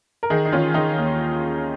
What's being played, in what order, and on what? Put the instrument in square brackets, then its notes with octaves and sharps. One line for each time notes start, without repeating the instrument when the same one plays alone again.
[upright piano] A#4
D#3 D#4 G#4
D#4
D#3 C#4 F4
D#3 D#4 G#4
D#2